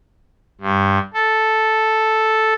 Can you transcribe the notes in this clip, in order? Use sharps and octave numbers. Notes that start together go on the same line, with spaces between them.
G2
A4